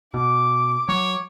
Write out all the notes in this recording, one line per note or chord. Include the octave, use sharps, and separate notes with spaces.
B2 D6
F#3 C#5